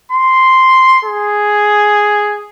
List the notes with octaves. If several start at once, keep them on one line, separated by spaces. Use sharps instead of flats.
C6
G#4